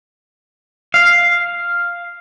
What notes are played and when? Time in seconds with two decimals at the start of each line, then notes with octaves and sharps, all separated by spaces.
0.94 F5